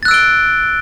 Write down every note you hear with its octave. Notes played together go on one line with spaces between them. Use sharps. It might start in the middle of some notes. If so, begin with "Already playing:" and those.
E6 F#6 A6 D7 G7